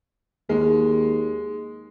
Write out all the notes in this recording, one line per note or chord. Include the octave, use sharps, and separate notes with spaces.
D#2 G#3